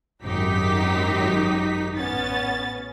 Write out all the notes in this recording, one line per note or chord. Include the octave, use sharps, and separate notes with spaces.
G#1 F#2 D#4 G4 B6
A1 B3 C#4 A6